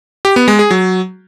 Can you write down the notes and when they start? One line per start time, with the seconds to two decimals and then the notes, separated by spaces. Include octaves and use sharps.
0.25 G4
0.36 B3
0.48 G#3
0.59 G#4
0.71 F#3